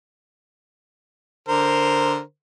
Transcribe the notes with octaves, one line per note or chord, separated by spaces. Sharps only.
D3 A#4 C5